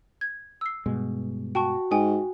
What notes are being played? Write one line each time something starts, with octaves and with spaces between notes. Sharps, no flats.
G#6
E6 C7
G2 B2 G#3
F#4 G5 A5 C#6
G#2 G5 G#5 D#6